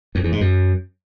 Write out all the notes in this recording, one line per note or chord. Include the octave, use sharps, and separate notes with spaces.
F2
E2
G#2
F#2